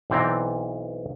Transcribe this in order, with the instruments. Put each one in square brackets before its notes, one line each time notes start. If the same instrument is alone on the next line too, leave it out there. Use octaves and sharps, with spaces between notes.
[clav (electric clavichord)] B1 E3 C4 D5 A#5